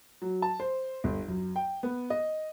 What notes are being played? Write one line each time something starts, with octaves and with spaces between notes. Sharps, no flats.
F#3
A5
C5
G1
F#2
G5
B3
D#5